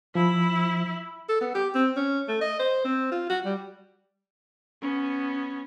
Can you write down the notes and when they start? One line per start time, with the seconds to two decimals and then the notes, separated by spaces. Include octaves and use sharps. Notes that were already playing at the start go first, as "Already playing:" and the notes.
0.15 F3 E4
1.29 A4
1.41 B3
1.55 G4
1.75 C4
1.97 C#4
2.28 A3
2.41 D#5
2.60 C5
2.85 C4
3.12 F4
3.30 F#4
3.45 G3
4.82 B3 C#4